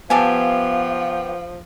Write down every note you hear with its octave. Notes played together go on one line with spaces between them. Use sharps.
F3 B3 G4 E5 F5 G#5 A5